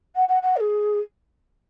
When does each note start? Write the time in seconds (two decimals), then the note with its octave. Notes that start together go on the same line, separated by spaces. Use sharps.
0.15 F#5
0.28 F#5
0.42 F#5
0.56 A#4
0.60 G#4